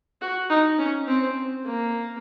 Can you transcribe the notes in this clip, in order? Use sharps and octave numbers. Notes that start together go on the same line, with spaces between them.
F#4
D#4
C#4
C4
A#3